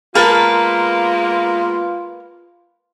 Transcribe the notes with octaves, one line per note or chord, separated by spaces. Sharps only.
G#3 A#3 B3 F4 A#4 B4 A5